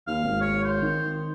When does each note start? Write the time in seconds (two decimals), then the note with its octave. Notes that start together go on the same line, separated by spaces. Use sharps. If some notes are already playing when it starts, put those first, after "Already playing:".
0.07 D#2 F5
0.23 G#1
0.42 C#5
0.64 C5
0.82 D#3